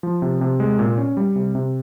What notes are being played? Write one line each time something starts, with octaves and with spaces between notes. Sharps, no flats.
F3
C3
C3
G#3
A#2
C#4
G3
C3
C3